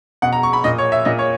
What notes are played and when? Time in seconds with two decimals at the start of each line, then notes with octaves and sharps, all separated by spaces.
0.22 B2 F#5
0.32 A#5
0.43 C#6
0.53 B5
0.64 A#2 D#5
0.78 C#5
0.92 E5
1.05 A#2 D#5
1.19 C#5